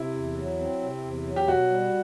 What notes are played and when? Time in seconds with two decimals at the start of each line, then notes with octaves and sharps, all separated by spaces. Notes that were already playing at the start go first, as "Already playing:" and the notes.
Already playing: C3 E4
0.15 E2
0.38 F#3
0.60 C4
0.82 C3
1.04 E2
1.26 F#3
1.36 G4
1.48 B2 F#4
1.70 G3